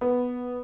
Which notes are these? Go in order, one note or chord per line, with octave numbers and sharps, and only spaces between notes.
B3